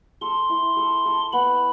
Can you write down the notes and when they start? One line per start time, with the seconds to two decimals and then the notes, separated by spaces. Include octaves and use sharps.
0.21 A4 C6
0.49 E4
0.76 A4
1.05 A4
1.33 B3 B5